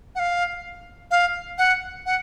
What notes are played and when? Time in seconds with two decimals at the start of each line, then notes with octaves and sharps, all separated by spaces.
0.15 F#5
0.19 F5
1.11 F5
1.58 F#5
2.06 F#5